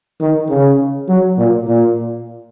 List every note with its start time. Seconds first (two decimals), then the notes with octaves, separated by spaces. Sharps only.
0.20 D#3
0.49 C#3
1.08 F#3
1.37 A#2
1.67 A#2